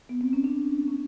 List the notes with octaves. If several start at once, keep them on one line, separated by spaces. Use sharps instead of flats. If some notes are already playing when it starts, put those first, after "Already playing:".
B3
C4
C#4
D4
C#4